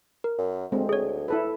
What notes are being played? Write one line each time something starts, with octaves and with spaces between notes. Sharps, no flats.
A#4
F#2
D2 G#3 C4
G#4 C#5
E4 A4 B4